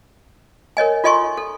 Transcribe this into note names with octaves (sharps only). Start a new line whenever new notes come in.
A#4 C#5 D#5 G#5
F4 A4 D#5 G#5 C6 C#6
A4